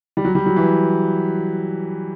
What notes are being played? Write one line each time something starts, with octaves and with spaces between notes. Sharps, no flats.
G3
F#3
G3
F#3
E3